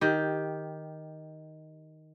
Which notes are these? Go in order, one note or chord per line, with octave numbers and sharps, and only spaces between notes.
D#3 G4